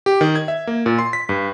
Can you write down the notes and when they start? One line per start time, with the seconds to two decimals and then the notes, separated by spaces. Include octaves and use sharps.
0.06 G4
0.21 D#3
0.35 G#6
0.48 E5
0.67 A#3
0.86 A#2
0.99 C6
1.13 B6
1.29 G2